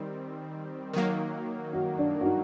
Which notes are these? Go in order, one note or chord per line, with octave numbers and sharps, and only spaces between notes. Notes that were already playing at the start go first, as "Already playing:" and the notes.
Already playing: D#3 G3 C4
D#3 F#3 A#3
F#4
D4
F#4
D#4